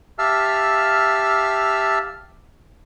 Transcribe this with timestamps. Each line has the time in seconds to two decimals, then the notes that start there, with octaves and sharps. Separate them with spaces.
0.19 G4 E5 F5 A5 E6 F6